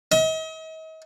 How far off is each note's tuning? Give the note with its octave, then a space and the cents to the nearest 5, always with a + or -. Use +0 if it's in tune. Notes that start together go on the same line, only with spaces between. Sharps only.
D#5 +40